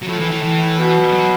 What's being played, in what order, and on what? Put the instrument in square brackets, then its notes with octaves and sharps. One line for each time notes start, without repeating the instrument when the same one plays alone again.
[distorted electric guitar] F#3
[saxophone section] A2 [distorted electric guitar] F3
[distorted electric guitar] E3
E3
E3
[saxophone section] B2
[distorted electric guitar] F#3